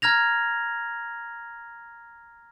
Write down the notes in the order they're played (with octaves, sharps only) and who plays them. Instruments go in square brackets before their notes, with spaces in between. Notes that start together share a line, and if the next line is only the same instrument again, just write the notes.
[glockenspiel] A#5 F6 G#6 A#6 F7